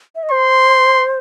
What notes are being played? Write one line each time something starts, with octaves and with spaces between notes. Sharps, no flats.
E5
D#5
C5 C6